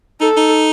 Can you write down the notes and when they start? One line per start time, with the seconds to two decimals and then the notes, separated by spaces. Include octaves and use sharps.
0.20 D#4 A4
0.37 D#4